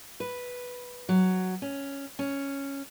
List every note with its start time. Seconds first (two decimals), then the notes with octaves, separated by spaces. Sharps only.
0.20 B4
1.09 F#3
1.62 C#4
2.19 C#4